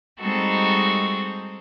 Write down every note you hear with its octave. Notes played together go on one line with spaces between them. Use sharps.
G3 G#3 C4 D#4 F#4 A4